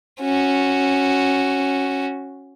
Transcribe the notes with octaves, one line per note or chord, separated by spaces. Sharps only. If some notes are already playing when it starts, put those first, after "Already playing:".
C#4 F#4